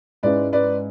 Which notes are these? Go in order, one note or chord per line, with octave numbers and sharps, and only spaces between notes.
G#2 G#3 C#4 E4 B4 D5
B4 D5